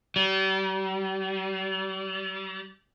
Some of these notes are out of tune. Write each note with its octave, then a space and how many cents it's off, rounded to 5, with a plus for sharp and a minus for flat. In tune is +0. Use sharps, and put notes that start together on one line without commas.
G3 -40